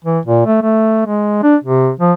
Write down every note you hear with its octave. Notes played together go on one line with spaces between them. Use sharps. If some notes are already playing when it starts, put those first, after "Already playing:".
E3
A#2
A3
A3
G#3
D4
C3
F3